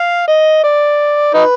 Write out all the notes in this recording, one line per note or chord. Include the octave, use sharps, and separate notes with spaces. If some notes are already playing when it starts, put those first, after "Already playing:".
Already playing: F5
D#5
D5
D#4 B4